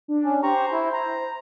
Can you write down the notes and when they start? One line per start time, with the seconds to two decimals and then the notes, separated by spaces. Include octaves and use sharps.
0.08 D4
0.25 C#4
0.43 G4 C5 A#5 C#6
0.72 E4
0.93 A#5